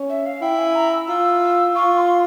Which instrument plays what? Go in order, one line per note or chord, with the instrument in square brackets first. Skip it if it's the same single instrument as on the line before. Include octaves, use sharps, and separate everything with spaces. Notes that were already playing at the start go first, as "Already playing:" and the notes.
Already playing: [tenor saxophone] C#4
[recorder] E5
F5
[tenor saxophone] E4 [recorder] G5
[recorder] G#5
A#5
E6
[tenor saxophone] F4
[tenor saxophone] F4 [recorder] C#6
[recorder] C6